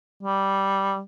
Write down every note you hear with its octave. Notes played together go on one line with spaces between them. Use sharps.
G3